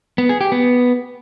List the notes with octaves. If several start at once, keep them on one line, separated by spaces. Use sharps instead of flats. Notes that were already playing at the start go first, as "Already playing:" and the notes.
B3
G#4
G4
B3